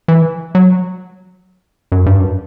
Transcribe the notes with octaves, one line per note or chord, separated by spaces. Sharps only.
E3
F#3
F#2
G2
F#2